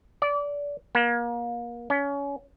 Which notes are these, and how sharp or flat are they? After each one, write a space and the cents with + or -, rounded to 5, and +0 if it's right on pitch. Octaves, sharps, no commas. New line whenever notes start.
D5 -25
A#3 +30
C#4 +25